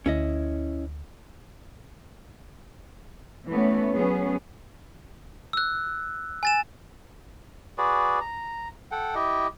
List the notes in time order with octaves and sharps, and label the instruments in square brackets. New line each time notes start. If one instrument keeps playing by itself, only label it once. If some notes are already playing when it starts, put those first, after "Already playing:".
[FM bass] D2 [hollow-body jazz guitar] C#4 E4 D#5
[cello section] E3 A3 B3 C#4 C#5
F#3 A3 B3 C#4 G#4
[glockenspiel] E6 F#6
G#5 A6 E7
[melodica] F#4 G#4 B4 D5
A#5
A4 F#5 G5
E4 G4 D#5